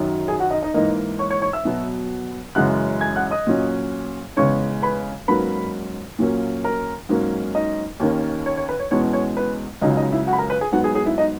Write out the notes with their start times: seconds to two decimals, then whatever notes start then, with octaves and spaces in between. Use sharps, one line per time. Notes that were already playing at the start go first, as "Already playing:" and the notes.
Already playing: F#2 D#3 F#3
0.28 G#4 G#5
0.40 F#4 F#5
0.51 D#4 D#5
0.63 D#4 D#5
0.74 G#2 E3 A#3 D#4 D#5
1.19 C#5 C#6
1.31 C#5 C#6
1.42 C#5 C#6
1.53 E5 E6
1.65 B2 F#3 B3
2.55 F#2 C#3 E3 G#3 C#4 F#5 F#6
3.01 G#5 G#6
3.16 F#5 F#6
3.31 D#5 D#6
3.47 A#2 F#3 C#4
4.37 E2 C#3 G#3 C#4 C#5 C#6
4.82 B4 B5
5.28 G#2 F#3 A#3 C#4 B4 B5
6.19 A#2 F#3 A#3 C#4
6.64 A#4 A#5
7.09 G#2 F#3 A#3 C#4
7.55 D#4 D#5
8.00 D#2 D#3 A#3 C#4
8.46 C#5
8.57 C#5
8.69 B4
8.79 C#5
8.91 E2 B2 G#3 C#4 C#5
9.13 C#5
9.37 B4
9.81 C#2 C#3 F#3 D#4 D#5
9.97 D#4 D#5
10.12 E4 E5
10.27 F#4 F#5
10.33 B5
10.38 A#4 A#5
10.50 B4 B5
10.61 G#4 G#5
10.72 G#2 F#3 B3 F#4 F#5
10.84 G#4 G#5
10.95 G#4 G#5
11.06 E4 E5
11.18 D#4 D#5